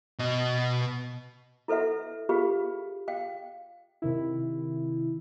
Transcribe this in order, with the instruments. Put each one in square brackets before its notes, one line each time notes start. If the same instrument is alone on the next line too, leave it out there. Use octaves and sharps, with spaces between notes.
[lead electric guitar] B2 D#5
[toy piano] E4 A4 B4 E5 F#5
F4 G4 G#4 B4 F5
F5 G5
[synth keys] C3 D#3 E4